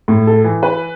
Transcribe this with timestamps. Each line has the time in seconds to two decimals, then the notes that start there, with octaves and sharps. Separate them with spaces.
0.08 A2
0.27 A4
0.44 E3
0.63 B4